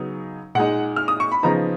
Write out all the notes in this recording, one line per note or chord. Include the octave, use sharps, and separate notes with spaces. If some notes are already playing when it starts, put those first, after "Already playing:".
Already playing: C#3 F#3 B3 D#4
A#2 G#3 D#4 F#5
F6
D#6
C#6
B5
C#3 F3 B3 D#4 A#5